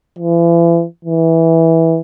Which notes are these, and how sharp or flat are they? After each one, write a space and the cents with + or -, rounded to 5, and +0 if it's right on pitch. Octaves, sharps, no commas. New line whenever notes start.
E3 +40
E3 -10